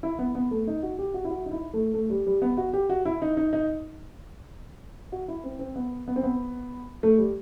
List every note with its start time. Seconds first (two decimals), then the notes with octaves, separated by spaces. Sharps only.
0.03 E4
0.19 B3
0.35 B3
0.51 A3
0.67 D#4
0.83 F#4
0.98 G4
1.14 F#4
1.25 E4
1.30 F#4
1.46 D#4
1.51 E4
1.74 A3
1.94 A3
2.10 G3
2.27 G3
2.42 B3
2.57 F#4
2.73 G4
2.90 F#4
3.05 E4
3.22 D#4
3.37 D#4
3.53 D#4
5.12 F#4
5.28 E4
5.44 C4
5.59 C4
5.76 B3
6.08 B3
6.16 C4
6.23 B3
7.03 A3
7.18 G3